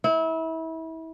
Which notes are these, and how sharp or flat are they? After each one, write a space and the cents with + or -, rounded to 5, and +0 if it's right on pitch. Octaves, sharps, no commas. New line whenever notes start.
E4 -30